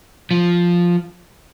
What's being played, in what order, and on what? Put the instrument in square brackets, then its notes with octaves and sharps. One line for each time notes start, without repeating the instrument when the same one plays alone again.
[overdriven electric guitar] F3